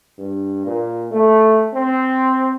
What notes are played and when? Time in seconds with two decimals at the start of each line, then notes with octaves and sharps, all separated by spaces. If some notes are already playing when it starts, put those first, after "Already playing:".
0.18 G2
0.66 A#2
1.12 A3
1.74 C4